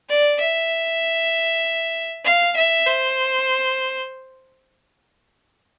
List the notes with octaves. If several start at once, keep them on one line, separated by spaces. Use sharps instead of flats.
D5
E5
F5
E5
C5